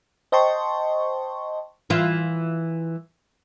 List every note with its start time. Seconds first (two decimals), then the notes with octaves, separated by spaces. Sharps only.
0.32 C5 D#5 G5 A5 C6 C#6
1.90 E3 F4